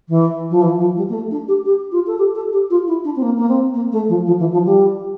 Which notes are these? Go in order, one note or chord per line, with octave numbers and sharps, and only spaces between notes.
E3
F3
E3
F3
G3
A#3
A3
D4
G4
G4
F4
A4
G4
A4
G4
F4
E4
D4
C4
A#3
A#3
C4
A#3
A3
F3
F3
E3
F3
G3